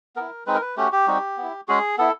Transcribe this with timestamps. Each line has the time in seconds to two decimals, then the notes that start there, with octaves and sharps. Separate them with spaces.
0.16 B3 E4 A#4
0.46 G#3 C4 D#4 B4
0.54 A#4
0.61 B4
0.77 A3 C#4 F#4 G4
0.92 G4
1.07 G3 C4 D#4 F#4
1.37 B3
1.42 E4
1.68 G#3 C#4 F#4 G#4
1.98 B3 E4 A4